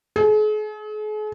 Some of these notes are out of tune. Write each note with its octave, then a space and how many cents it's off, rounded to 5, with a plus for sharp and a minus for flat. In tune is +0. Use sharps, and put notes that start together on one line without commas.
G#4 +45